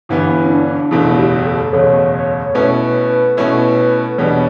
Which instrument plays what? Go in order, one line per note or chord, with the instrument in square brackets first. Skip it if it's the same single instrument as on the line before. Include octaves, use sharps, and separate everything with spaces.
[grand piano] G1 G2 E3 B3 [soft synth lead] E4
[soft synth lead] C#4
D4
[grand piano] F#1 E2 B2 A3 [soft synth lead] E4
[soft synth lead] G4
A4
[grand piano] F#1 E2 B2 A3 [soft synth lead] C#5
[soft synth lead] C#5
[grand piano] B2 A3 C#4 E4 [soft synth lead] B4
[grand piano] B2 A3 C#4 E4
[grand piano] E2 B2 G3 D4 [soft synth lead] C#5